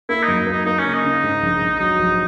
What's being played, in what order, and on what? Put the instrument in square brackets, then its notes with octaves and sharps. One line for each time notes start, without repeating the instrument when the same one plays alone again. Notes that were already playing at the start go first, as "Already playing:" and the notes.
[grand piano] A#3 [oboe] E4
[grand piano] F#2 [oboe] D#4
[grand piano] A#3 [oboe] D#4
[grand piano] A#3 [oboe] D#4
[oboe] C#4
[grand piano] C#3
[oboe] D#4
[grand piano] C#3
G#2
A#1
A#1
[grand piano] F#3 [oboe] D#4
[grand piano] A#1